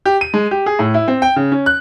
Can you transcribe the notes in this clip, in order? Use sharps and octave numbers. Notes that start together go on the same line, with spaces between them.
G4
D#7
G#3
G4
G#4
A2
E4
C4
G5
C#3
C#4
F#6